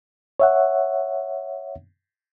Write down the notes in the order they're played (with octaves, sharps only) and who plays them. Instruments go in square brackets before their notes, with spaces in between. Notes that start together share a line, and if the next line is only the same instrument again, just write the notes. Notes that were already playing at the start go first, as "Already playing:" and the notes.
[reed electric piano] C#5 E5 F#5